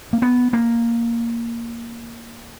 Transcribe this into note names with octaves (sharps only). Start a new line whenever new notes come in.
A#3
B3
A#3